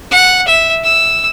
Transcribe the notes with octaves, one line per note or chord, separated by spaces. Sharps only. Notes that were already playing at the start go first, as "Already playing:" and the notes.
F#5
E5
E6